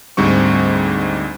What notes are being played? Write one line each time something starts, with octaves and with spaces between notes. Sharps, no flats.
D2 G#2 G3 C4 C#6